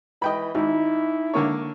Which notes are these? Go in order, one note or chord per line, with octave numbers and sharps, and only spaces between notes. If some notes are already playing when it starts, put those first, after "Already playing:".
E3 D#5 G5 B5
G#1 D#4 E4
D3 A#3 C#5